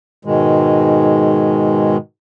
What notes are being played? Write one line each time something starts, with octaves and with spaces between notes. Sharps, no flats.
G#2 B2 D#3 G#3